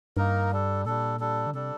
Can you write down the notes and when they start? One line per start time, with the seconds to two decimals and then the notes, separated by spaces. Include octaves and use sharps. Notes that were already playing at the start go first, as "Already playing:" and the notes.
0.17 G2 A#3 D#4 A#4
0.51 G3 D4 A4
0.86 A#2 G3 D4 A4
1.20 G3 D4 A4
1.47 D3
1.54 C3 G3 D4 A4